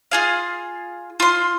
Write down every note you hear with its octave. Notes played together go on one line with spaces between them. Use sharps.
F4 G#4 F5
F4 C6